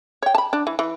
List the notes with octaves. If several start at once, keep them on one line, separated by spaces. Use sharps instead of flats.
C#5 G5
A5 B5
D4
E3
E3